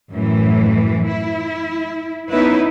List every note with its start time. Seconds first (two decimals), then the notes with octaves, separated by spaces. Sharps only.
0.13 F#2 A2 E3
1.08 E4
2.30 B3 C#4 D#4 E4 B4